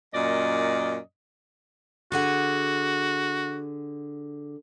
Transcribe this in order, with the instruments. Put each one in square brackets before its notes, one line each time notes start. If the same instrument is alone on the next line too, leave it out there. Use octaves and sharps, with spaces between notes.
[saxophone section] F#2 A#2 D5 D#5
[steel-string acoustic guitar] D3 G#4 F#5 [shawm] F#4